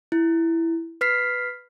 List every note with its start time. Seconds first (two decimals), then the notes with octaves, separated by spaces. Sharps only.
0.12 E4
1.01 B4 F6 B6 C7